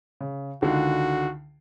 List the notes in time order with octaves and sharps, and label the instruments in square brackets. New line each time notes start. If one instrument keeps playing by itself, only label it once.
[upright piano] C#3
[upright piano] C#2 D3 D#3 [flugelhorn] F#4